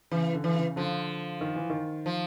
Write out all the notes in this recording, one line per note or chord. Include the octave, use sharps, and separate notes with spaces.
C#3 E3
D3
E3
C#3
D3 F3
D#3
E3
D#3
F3